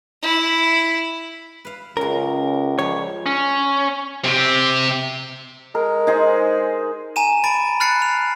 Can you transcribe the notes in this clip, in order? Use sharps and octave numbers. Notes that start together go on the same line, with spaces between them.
E4
B4 F5
C#2 C#3 C#4 A#4
F3 G3 C#5
C#4
C3 G4
G#3 A#4
D#4 G#4 C5
G#5 A#5 D#7 E7
A5 B5 A6 D7
B5 F6 F#6 A6 C7 C#7
F7